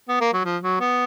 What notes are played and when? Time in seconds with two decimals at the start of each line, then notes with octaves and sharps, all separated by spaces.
0.09 B3
0.20 A#3
0.33 F#3
0.44 F3
0.63 F#3
0.80 B3